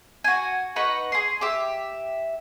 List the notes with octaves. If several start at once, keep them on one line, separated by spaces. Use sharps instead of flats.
F#4 G#5
D#4 B4 F#5 C#6
G#4 C6
G4 E5